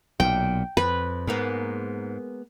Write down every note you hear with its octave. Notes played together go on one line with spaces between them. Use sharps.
B1 A#2 G5
F2 B4
G#2 G#3 A#3 B3